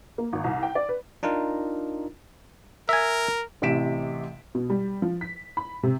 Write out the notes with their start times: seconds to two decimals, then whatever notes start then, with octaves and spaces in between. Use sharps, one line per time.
0.18 A#3
0.33 G#1
0.44 C2
0.63 G5
0.75 D5
0.89 B4
1.23 D4 D#4 F4 A#4
2.89 A#4 E5 G#5
3.62 A1 C3 E3 B6 D7 E7
4.55 B2
4.70 G3
5.02 F3
5.21 B6
5.57 B5
5.83 C3